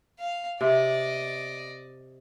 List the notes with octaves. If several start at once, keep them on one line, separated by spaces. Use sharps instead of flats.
F5
C3 D5 D#5